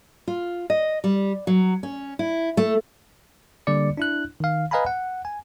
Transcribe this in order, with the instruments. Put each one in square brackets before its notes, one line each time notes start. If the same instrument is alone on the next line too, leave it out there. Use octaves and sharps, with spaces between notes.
[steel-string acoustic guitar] F4
D#5
G3
F#3
C#4
E4
A3
[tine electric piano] D3 G3 A#3 D5 C#7
D4 E4 F#6
D#3 F5
B4 D#5 F5 G#5 A#5 B5
F#5
G#5